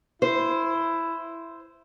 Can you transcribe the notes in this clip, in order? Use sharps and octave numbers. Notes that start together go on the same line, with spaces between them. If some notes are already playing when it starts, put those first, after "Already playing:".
E4 C5